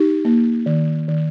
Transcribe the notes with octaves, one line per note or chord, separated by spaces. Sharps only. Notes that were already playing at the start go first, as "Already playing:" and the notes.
Already playing: D#4 G4
A#3
D#3
D#3